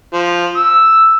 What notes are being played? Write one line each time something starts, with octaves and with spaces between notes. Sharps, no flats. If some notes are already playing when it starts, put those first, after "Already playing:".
F3
E6